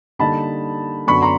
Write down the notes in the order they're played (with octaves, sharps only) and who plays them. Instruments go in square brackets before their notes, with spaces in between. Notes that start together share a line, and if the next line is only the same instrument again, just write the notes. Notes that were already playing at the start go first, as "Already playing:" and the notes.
[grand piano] D3 G3 A#3 D#4 A5 B5
F#2 D3 F#3 B3 D4 B5 C#6
A#5 C6